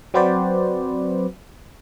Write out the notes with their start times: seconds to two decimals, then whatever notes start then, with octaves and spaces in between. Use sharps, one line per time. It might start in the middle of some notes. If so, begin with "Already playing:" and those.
0.14 F#3 C4 F#4 B4 C5 D5